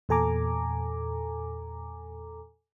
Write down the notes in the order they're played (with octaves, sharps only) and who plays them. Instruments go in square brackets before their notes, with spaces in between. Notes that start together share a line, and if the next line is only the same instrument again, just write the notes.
[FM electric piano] E2 A#2 A4 G#5 A#5 D6